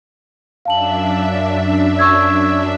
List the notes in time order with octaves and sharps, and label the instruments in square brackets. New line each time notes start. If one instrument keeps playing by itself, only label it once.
[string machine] F#2 D4 E5 [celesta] F5 A5 F#7
[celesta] C#6 E6 G#6